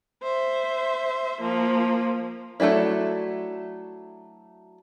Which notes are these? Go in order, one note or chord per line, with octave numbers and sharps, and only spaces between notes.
C5 E5
F3 A#3
F#3 A3 A#3 D4 E4